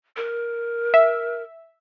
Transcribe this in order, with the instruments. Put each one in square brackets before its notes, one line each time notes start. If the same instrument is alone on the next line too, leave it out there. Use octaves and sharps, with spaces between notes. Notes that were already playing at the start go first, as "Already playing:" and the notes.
[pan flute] A#4
[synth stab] E5